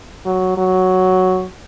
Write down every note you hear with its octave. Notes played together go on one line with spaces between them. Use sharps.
F#3
F#3